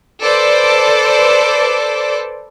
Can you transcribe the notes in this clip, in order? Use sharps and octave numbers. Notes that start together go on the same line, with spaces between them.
A4 B4 C5 D5 D6